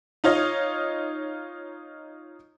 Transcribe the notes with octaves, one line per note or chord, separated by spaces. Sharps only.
D#4 F4 C#5 D#5